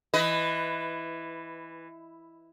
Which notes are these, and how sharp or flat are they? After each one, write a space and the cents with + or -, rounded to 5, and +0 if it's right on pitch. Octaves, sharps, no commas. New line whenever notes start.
E3 +0 B4 +20 D#5 +10